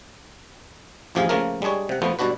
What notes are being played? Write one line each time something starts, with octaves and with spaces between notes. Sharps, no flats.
A1 F2 F3 G4 G#4 F5
C#3 F3 A3 A#3 A#4
G3 G#3 D4 G#4 C#5
C3 F#5
F2 F3 A3 B3 C5
G2 B2 D4 F#4 B4